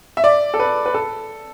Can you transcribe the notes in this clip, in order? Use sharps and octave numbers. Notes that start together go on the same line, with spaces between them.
E5
D5
A4
B4
B4
A4